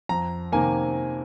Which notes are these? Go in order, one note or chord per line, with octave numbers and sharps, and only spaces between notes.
F2 A#5
C3 D#3 A#3 G#5